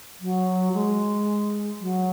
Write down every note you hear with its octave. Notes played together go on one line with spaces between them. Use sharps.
F#3
G#3
F#3